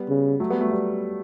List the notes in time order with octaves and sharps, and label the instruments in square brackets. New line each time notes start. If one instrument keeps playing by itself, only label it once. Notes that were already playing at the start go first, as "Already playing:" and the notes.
Already playing: [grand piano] G3 B3
[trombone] C#3
[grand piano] F#3 A3
G3 B3
F#3 A3
G3 B3